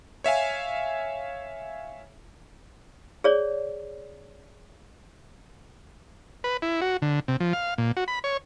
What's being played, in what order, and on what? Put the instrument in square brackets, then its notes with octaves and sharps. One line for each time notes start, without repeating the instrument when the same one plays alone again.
[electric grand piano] C#5 E5 F5 G#5
[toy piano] G#4 C#5 D5
[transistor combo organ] B4
E4
F#4
D3
C3
F3
F5
A#2
F#4
B5
C#5